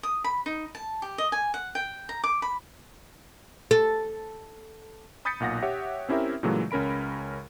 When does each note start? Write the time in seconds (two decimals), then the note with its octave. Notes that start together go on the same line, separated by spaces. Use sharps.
0.03 D#6
0.24 B5
0.46 D#4
0.75 A5
1.02 G4
1.18 D#5
1.32 G#5
1.54 F#5
1.75 G5
2.09 A#5
2.24 D6
2.42 B5
3.71 A4
5.25 B5 D#6 G6 A6 B6 C#7
5.40 B1 A#2 F#5 A#6
5.62 G4 C#5 E5 F#5
6.09 C4 C#4 E4 G4 A#4 E5
6.43 A#2 C#3 E3 F#3 G#3 A3
6.71 C#2 C#4 A#4 B5 D7